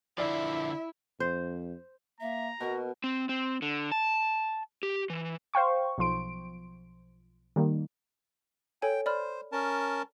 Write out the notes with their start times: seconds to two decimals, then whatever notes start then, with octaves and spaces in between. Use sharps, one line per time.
0.18 D3 F3 E4 D5 E5
1.20 F2 C5
2.20 A#3 E5 A#5
2.60 B2 F#4 A#4
3.04 C4
3.29 C4
3.62 D3
3.92 A5
4.83 G4
5.10 E3
5.54 C5 F5 G5 C#6
5.98 B1 F3 C6 D7
7.56 D#3 G3 A#3
8.82 A4 C#5 G5 G#5
9.06 C5 D5 B5 F6
9.52 C#4 A#4 A5